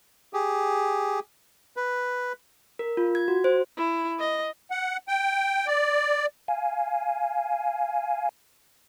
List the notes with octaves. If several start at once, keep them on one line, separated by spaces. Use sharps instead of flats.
G4 G#4
B4
A#4
F4
G#6
F#4
C5
E4
D#5
F#5
G5
D5
F5 G#5